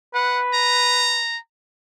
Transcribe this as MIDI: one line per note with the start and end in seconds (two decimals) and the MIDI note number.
0.14 1.23 71
0.14 0.42 78
0.54 1.37 82